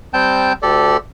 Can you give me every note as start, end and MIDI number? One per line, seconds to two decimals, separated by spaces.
0.14 0.53 55
0.14 0.53 60
0.14 0.53 79
0.14 0.53 81
0.14 0.53 91
0.62 0.97 38
0.62 0.97 67
0.62 0.97 69
0.62 0.97 74